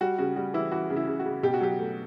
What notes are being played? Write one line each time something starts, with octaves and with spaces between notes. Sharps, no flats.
G3 F#4
C#3 F#4
G3 F#4
E3 E4
E3 F#4
C#3
E4
C#3
F#4
C#3
B2 G4
F#4
F#3 G4
A3